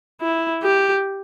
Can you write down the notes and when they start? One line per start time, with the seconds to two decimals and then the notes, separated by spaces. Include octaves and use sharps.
0.21 E4
0.63 G4